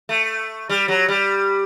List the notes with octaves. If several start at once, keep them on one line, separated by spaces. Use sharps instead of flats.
A3
G3
F#3
G3